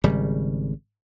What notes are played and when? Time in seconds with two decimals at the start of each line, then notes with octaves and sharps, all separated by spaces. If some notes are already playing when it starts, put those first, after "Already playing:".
0.04 G#1 C#3 G3